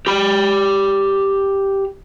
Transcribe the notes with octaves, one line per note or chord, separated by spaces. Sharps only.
G4 B5